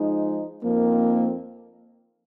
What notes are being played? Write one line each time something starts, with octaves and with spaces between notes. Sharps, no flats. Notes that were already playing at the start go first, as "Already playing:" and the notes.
Already playing: F3 G#3 D#4
F2 F3 A#3 C4 D#4 A#4